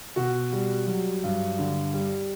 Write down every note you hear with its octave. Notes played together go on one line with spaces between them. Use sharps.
B2 F#4
G3
F#3
G2
D3
G3